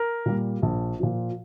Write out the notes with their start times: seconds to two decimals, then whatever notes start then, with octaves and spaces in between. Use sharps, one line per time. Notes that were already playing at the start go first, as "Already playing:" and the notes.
Already playing: A#4
0.26 A#2 G3 A#3
0.62 A#1
1.00 A#2 F3